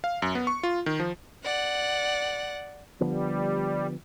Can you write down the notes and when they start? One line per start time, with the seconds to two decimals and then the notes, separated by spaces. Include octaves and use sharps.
0.04 F5
0.22 F#2
0.35 B3
0.47 C#6
0.63 F4
0.86 D#3
1.00 F3
1.44 D5 F#5
3.01 D3 F3 G3 B3